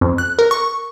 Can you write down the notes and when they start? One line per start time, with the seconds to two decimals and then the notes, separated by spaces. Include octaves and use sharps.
0.01 F2
0.18 F#6
0.39 A#4
0.51 C#6